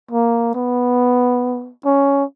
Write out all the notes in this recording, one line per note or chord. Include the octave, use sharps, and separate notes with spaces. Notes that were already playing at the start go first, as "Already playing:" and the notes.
A#3
B3
C#4